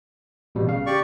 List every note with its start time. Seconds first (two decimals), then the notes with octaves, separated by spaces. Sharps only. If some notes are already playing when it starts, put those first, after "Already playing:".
0.55 A1 B2 G3
0.68 C#3 F5
0.86 G4 D5 C#6